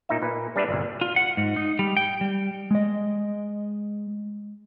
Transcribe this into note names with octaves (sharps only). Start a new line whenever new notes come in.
A#2 D#4 E5
A#2 B4
G3 D4 G4 B4 D5 E5
G1 C2 A#2
F4
F#5
G#2
D#4
G3
G5
G3
G#3 D#5